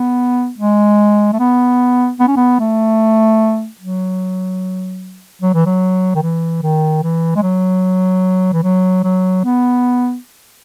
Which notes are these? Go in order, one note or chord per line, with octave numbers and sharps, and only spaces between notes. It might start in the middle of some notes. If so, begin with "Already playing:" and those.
Already playing: B3
G#3
A3
B3
B3
C#4
B3
A3
F#3
F#3
E3
F#3
D#3
E3
D#3
E3
G#3
F#3
E3
F#3
F#3
B3